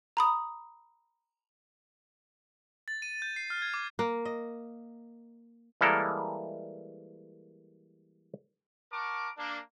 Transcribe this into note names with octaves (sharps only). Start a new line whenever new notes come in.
A#5 B5 D#6
A6
D#7
G6
C7
F6
G#6
D6
A#3
D#5
E3 G3 G#3 A#3 A4 A#4
A#4 F#5 A5 C#6 D6
A#3 D4